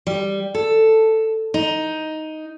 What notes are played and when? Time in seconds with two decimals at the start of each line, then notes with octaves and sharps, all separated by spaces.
0.07 G3
0.54 A4
1.54 D#4